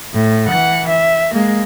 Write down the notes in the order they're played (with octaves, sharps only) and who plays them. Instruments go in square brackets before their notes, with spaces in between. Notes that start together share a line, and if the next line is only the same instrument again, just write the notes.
[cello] A2
E3 F#5
E5
G#3 A#3